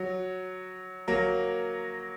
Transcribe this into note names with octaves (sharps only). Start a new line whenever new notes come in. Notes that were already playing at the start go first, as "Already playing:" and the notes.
Already playing: F#3
F#3 A#3